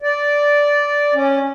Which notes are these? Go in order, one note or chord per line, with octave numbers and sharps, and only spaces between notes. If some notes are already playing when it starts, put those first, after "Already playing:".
D5
C#4